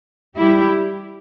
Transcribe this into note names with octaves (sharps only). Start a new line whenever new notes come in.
G3 E4 G4